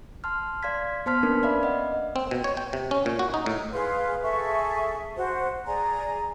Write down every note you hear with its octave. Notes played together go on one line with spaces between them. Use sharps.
A5 C6 F6
D5 F5 C6 G#6 B6
B3 C5 A5 C6 F6 B6
A#3 C#4 D4 A#4 B4
D5 E5 F5 B5
D#5 F#5
C4
B2
C#5
G5
C3
C#4
A#2
F#4
D#4
A2
G#4 B4 F5 C6
G#4 A4 E5 C#6
F#4 C5
G#4 D5 G#5 A#5